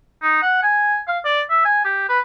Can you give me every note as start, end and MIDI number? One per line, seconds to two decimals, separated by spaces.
0.22 0.39 63
0.42 0.59 78
0.63 0.98 80
1.07 1.18 77
1.25 1.41 74
1.50 1.60 76
1.65 1.84 80
1.85 2.04 67
2.09 2.19 71